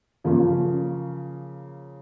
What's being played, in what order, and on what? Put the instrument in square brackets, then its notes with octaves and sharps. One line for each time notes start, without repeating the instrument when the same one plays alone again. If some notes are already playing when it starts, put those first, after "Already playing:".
[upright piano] C#3 F3 A#3 C#4 F4